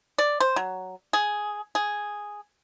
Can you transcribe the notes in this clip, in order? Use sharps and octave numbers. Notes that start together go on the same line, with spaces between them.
D5
C5
F#3
G#4
G#4